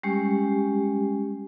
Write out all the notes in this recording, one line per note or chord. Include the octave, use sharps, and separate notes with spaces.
G3 G#3 C#4 G4